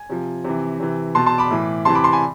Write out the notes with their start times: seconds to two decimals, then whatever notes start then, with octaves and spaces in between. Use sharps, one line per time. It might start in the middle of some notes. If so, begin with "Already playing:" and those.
Already playing: G#5
0.09 C3 F3
0.44 C3 E3
0.80 C3 E3
1.15 B2 A5 C6
1.26 A5 C6
1.38 B5 D6
1.50 A2 E3
1.85 C3 E3 A5 C6
1.95 B5 D6
2.04 A5 C6
2.12 G#5 B5